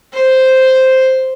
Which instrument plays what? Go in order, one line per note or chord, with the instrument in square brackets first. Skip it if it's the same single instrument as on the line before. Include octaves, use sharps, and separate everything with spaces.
[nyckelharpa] C5